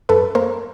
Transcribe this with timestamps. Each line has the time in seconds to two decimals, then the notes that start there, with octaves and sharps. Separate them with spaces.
0.09 F#2 A4 B4
0.35 A#3 A#4 C5